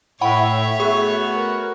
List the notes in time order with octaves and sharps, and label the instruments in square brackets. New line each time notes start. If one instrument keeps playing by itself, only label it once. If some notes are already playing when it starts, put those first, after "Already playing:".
[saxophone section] A2 [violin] C#5 [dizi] E5 [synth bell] F#5 G5 B5
[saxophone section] A3 B3 F#4 [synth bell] G#4 C#6
[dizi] A#4